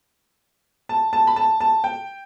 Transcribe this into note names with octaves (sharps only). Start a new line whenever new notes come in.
A5
A5
B5
A5
A5
G5